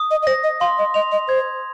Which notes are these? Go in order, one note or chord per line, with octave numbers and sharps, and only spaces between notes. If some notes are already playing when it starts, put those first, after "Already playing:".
Already playing: D#6
D#5
D#5
C5 A#6
D#5
F5 C6
D#5
D#5 F7
D#5
C5 G#6